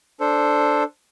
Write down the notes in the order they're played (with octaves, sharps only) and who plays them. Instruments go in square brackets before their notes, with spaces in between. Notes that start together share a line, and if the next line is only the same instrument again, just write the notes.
[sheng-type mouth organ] D4 A4 C5